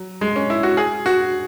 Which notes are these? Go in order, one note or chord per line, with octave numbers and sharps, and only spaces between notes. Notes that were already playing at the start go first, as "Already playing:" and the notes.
Already playing: F#3
G#3
C#4
E4
F#4
G#4
F#4